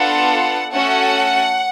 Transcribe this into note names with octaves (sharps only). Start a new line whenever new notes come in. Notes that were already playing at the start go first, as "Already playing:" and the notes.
Already playing: B3 D4 F4 A4 F#5
A3 C#4 F#4 A4 F#5